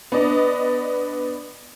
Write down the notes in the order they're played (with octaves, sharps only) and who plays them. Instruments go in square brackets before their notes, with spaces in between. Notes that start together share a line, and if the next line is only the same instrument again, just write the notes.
[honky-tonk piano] B3 D4 D5 D#5